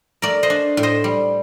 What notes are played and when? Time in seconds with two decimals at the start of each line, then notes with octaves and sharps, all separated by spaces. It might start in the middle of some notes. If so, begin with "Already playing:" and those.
0.22 A3 A#4 D5
0.43 C5 D#5
0.50 D4
0.77 A2
0.83 C5 D#5
1.04 G3